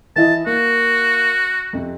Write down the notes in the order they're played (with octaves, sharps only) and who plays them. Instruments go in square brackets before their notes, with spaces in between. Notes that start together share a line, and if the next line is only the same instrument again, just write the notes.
[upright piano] E3 E4 D#5 [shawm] A5
[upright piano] A#3 [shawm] F#4
[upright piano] F2 C3